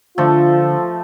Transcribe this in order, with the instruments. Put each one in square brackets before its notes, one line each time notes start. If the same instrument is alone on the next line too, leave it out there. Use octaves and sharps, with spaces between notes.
[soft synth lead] D3 [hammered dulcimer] F3 A3 A4 [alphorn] F4